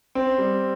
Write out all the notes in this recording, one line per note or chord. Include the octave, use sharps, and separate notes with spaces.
C4
G3